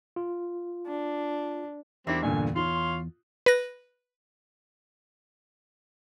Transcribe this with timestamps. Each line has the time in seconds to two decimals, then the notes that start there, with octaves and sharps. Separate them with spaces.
0.16 F4
0.87 D4
2.07 E2 G3 A#3 C4 D4 E4 E5
2.23 G2 A#2 D3 G#5
2.56 F4 C#5 F5 C6
3.46 B4 A#6